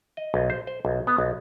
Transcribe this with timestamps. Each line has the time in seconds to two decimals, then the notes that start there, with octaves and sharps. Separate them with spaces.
0.17 D#5
0.34 B1
0.50 C5
0.67 C5
0.85 B1
1.07 B3
1.18 B1